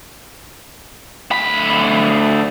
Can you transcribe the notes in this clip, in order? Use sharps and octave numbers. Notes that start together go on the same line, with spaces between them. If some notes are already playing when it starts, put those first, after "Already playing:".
D2 B5